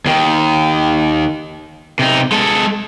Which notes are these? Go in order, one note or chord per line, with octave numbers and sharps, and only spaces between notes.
D#2 D#3
C3 D#4
G#3 A4